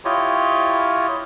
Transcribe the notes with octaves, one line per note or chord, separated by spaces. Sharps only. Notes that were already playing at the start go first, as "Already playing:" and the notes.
E4 F4 G4 C#5 D#5